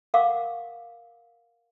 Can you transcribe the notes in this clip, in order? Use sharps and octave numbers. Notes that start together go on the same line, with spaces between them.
A#4 F5 F#5 C#6 D6